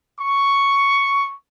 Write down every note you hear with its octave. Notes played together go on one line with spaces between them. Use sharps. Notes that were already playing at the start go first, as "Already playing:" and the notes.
C#6